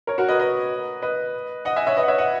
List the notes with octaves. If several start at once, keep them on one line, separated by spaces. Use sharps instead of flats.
A#4 C#5
F#4 A#4
B4 D#5
B4 D#5
B4 D#5
D#5 F#5
E5 G#5
C#5 E5
B4 D#5
F#5
C#5 E5
D#5 F#5